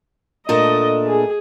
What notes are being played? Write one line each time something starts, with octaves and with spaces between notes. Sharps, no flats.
A#2 A3 D4 D#5
G#4